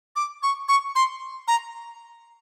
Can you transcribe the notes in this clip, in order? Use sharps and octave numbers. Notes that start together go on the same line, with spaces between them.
D6
C#6
C#6
C6
A#5